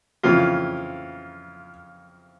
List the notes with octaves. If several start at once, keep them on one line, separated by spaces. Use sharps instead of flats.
F2 C#3 E3 F4